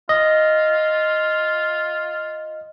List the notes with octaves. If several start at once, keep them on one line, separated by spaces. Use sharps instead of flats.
F4 D#5